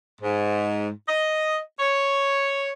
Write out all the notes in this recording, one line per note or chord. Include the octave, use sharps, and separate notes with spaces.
G#2
D#5
C#5